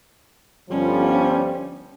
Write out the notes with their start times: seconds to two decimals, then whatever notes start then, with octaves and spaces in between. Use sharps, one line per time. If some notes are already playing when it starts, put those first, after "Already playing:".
0.70 G1 F3 G3 C#4